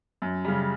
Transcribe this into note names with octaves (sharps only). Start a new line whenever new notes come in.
F#2
C#3 G3